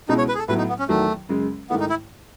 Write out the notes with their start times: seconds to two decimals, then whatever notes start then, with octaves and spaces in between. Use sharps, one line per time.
0.08 C#2 B2 G#3 B3 D#4 E4
0.18 C#5
0.29 B4
0.35 G#4
0.39 A4
0.48 A2 F#3 B3 B4
0.58 D#4
0.69 B3
0.79 C#4
0.88 E2 D#3 F#3 A3
1.29 F#2 C#3 G#3
1.70 G#2 D#3 A3 B3 E4
1.80 D#4
1.90 E4